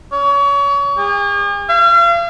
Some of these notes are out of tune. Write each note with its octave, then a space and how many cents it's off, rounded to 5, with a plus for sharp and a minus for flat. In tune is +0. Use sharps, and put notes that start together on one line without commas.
C#5 +30
G#4 -45
F5 -40